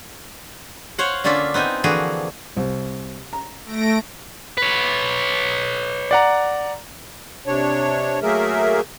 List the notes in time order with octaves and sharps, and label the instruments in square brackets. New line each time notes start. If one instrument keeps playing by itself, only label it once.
[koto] C5 C#5 F5 F#5
D3 A#3 C#4 F4 D5 E5
B3 C4 D#4 G#5
D3 E3 F3 A#3 F#4 G#4
[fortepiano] C2
A#5
[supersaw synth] A3 A#6 D7
[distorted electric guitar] B4 C#5
[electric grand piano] D5 F#5 A#5
[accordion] C3 D4 C#5
F#3 A3 A#3 G#4 A#4 E5